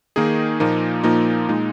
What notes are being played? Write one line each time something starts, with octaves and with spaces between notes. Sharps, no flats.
D#3 A#3 D#4 G#4
A#2 F3 A#3 D#4
A#2 F3 A#3 D#4
A#2 G#3 D#4